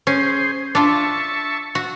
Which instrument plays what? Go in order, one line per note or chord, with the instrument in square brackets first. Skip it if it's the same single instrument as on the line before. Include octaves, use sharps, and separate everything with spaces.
[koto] C#4 [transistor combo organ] G#4 C5
[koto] D4 F4 [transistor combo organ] E5 A5 C#6
[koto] F#4